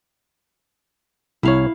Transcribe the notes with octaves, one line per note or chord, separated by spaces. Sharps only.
C2 E4 C#5 F5